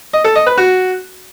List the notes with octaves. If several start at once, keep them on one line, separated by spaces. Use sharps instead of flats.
D#5
A4
D#5
B4
F#4